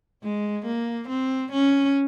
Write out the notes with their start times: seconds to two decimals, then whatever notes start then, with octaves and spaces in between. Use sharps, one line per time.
0.23 G#3
0.66 A#3
1.08 C4
1.52 C#4